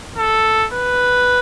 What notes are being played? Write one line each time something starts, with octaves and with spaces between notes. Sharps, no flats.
A4
B4